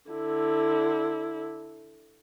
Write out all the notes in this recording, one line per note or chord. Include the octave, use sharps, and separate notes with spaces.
D3 E4